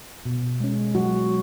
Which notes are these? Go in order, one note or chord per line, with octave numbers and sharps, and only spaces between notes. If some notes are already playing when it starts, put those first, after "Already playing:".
B2
G#3 C#4
F#3 F#4